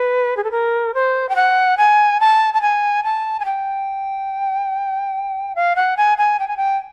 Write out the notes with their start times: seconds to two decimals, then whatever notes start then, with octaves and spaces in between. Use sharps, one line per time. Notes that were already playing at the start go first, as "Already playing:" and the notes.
Already playing: B4
0.37 G#4
0.44 A4
0.51 A#4
0.94 C5
1.29 G5
1.36 F#5
1.77 G#5
2.20 A5
2.54 A5
2.62 G#5
3.04 A5
3.40 G#5
3.45 G5
5.55 F5
5.76 F#5
5.97 G#5
6.18 G#5
6.39 G5
6.48 G#5
6.57 G5